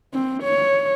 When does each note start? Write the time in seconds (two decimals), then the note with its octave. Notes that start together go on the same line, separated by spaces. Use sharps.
0.14 C4
0.43 C#5